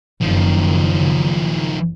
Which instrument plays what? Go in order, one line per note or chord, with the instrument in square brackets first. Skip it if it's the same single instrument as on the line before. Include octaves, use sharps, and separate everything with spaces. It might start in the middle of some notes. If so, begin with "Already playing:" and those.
[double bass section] F#1 [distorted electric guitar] D#3 F3